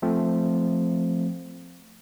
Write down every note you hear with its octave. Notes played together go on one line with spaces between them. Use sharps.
F3 A3 C4